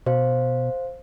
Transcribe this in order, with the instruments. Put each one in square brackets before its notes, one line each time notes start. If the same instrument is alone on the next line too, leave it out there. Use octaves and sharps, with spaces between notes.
[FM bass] B2 [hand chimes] C5 F5